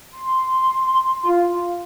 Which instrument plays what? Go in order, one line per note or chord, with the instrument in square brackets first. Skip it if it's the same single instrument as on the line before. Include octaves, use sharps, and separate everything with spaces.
[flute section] C6
[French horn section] F4